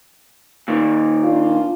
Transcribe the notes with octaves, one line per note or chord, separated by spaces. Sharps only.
A#2 D#3
A#3 D4 F4